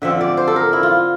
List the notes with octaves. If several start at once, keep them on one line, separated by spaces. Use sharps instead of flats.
D3 F3 C4 E5
D5
C5
A4
A#4
E4
F4